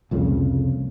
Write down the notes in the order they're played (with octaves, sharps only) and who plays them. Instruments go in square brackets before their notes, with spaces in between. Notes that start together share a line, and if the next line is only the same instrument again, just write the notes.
[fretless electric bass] C2 F2 A#2 C#3